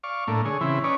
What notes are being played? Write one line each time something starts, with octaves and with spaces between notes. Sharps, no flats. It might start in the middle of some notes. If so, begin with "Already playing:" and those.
D5 F5 C#6
A2 A3 A#3 D4
D3 G#4 C#5
C#3 E3 C4 E4
C#4 D#4 B4 C#5 D5